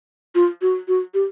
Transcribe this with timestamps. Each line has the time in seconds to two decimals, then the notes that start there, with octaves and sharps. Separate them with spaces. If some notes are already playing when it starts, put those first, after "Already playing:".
0.35 F4
0.62 F#4
0.88 F#4
1.14 G4